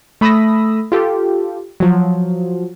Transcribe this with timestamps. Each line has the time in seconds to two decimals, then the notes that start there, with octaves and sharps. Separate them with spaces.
0.21 A3 B5 D#6 E6 A#6
0.92 F4 G4 A4
1.80 F3 F#3